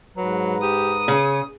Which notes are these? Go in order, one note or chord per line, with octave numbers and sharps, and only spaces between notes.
G#2 F#3 B4 A#5
G4 D#6
C#3 C#5